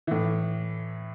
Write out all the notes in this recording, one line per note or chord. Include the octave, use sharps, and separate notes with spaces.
A2 E3